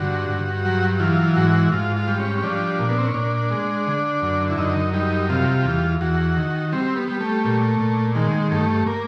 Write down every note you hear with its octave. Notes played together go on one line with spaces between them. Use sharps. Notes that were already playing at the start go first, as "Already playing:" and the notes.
Already playing: G2 D3 F#4
G2
F#3
E3 F4
G#2 F#4
G#2 F4
F4
G3
C#4
C#4
F3 D4
A#2
B3
C4
C#4
A#2 D4
G#3
D3
F#2
E4
F#2 D#4
G3 D#4
C3 F4
E2
E2 F#4
D#3
G3 C4
B3
G3
A3
A#2
A#2
D#3 G#3
G2 A3
A#3